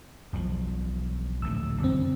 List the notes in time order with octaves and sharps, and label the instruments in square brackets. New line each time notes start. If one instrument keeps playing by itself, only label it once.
[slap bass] E1 B1 F3
[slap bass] D1 A#1 A3 [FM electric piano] E6
[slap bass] F#1 E2 [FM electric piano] D3 C4